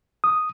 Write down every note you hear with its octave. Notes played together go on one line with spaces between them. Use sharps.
D#6